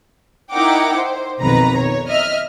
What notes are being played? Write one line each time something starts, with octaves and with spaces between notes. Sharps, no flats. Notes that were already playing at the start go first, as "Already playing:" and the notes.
D#4 E4 A#4 F#5 G5 D6
C5
B1 F2 D#3 B4 A#5
C#5
D#5 E5 F6